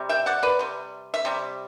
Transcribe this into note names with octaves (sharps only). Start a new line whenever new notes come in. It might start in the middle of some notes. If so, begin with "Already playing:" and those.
Already playing: C3 G3
E5 G5
D5 F#5
B4 D5
C3 G3
E5
C3 G3